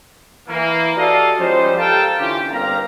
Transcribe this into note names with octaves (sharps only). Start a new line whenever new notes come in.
E3 A#3
F#4 G4 A4 D5 D#5 F5
F3 G3 G#3 C#4 D#4 C5
G4 A4 A#4 F5 G5 A5
D3 E3 C#4 F4 G4
G1 A#3 C4 F5 A#5